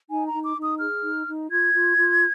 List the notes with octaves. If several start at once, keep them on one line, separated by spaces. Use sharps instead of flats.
D#4 G#5
A#5
D#4
D6
D#4
D#6
G#4 F6
D#4
D#4
F4 G#6
F4
F4